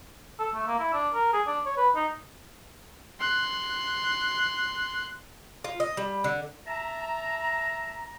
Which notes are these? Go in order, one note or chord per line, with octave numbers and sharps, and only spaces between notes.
A4
A3
A#3
E4
D4
A#4
G#4
D4
C#5
B4
D#4
C6 F#6
F4
D#5
G3
D3
E5 A5 A#5